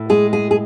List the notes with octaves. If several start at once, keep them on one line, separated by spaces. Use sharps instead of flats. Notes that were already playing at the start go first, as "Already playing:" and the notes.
Already playing: A2
G#3 G#4
G#4
G#4